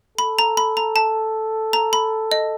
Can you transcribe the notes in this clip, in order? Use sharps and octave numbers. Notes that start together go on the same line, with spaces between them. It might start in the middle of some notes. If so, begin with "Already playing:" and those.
A4 B5
A#5
B5
A#5
A5
A#5
B5
D#5